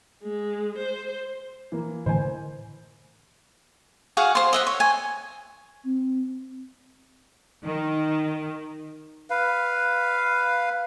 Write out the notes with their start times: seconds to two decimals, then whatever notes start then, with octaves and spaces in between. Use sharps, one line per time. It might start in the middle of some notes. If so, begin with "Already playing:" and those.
0.23 G#3
0.78 C5
1.72 E3 A#3
2.06 A2 D3 E3 C5 G#5
4.17 F#4 G#4 F5 F#5
4.35 C5 C6
4.53 D#5 E5 F#5
4.67 C#5
4.80 G#5
5.84 C4
7.62 D#3
9.30 B4 F5